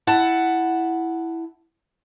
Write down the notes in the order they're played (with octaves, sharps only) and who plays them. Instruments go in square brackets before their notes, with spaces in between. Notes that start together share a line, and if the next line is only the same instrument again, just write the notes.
[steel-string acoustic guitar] E4 F#5 A5